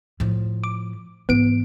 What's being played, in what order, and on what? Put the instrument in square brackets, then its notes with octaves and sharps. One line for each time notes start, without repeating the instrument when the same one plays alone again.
[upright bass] A2 F3
[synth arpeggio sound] D6
[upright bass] G#2 E3 [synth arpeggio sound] B3 D7